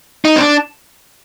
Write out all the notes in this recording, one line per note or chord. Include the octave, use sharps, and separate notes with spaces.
D#4
C4
D4